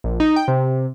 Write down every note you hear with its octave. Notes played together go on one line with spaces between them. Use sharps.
A#1
D#4
G5
C3